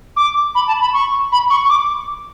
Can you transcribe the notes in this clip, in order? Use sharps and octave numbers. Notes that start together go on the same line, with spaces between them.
D6
B5
A5
B5
C#6
B5
C#6
D6